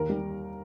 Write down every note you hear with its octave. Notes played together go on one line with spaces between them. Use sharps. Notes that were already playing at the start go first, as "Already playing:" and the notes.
Already playing: D#2 A#4
G3